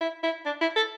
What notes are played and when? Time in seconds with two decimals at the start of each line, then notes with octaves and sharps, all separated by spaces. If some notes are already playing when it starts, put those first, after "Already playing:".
0.01 E4
0.23 E4
0.46 D4
0.61 E4
0.76 A4